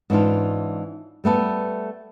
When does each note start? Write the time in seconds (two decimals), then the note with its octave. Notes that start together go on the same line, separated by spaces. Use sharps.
0.10 G#2 E3 C#4 D4 F4
1.24 G3 A3 B3 A4